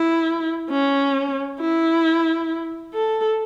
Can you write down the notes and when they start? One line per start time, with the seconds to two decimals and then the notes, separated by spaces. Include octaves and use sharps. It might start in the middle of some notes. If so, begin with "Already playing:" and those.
Already playing: E4
0.71 C#4
1.61 E4
2.94 A4